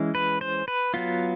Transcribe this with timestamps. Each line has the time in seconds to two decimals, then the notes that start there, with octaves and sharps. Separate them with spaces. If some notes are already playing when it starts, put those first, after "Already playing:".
Already playing: E3 G#3 C#4
0.15 B4
0.41 C5
0.68 B4
0.94 F#3 B3 F4